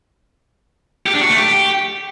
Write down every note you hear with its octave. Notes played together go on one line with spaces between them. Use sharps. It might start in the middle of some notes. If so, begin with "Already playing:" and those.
G4
D4
F#4
A3
G4